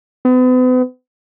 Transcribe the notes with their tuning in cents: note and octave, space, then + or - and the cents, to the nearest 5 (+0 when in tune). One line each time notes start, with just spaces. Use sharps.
B3 +40